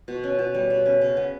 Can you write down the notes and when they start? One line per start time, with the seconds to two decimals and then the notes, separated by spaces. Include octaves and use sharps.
0.08 B2
0.24 C#4
0.39 B2
0.54 G3
0.70 B2
0.86 C#4
1.01 C#3
1.17 B3